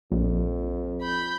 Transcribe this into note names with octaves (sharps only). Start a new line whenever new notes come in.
A#1 F2
B5 G6